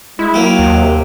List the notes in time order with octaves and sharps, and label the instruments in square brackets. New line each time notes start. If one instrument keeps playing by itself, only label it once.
[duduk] G#3 [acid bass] E4
[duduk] F#3 [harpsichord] A#3 G4
[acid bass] D#2
[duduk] C3